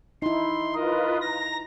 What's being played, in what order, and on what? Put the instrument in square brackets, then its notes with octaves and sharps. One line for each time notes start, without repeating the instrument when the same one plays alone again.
[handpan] D#4 E4 [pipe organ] C6
[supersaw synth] F4 B4 [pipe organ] A#4 D#5
[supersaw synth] A#5 [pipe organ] A#6